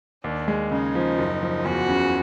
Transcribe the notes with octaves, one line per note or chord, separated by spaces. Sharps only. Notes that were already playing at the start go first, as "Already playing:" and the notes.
D#2 D4
G#3
C#3 D#4
F3
F#1
F3
E2 F#4
C#3